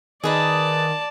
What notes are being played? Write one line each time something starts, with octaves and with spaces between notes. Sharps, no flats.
D#3 G#4 B4 D5 D#5 A5